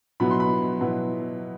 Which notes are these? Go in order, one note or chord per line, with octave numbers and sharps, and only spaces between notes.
B2 F#3 B3 E4 B5
C6
B5
B2 F#3 B3 E4